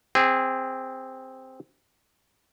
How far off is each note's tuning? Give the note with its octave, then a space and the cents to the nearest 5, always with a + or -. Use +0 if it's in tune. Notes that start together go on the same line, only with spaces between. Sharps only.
C4 +0 G#4 -20